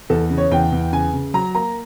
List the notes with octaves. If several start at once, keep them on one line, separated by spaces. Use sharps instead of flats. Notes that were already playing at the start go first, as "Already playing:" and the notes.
E2 A4
C#3
C#5
E2 G5
E2
C#3 G#5
C#3
F#3 A#5
A#3 A#5